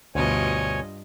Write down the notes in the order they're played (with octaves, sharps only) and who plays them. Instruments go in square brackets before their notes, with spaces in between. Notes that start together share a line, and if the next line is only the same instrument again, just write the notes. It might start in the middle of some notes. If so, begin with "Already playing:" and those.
[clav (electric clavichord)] D2 B2 [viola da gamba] G2 F4 D#5 [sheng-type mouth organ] C#5 G#5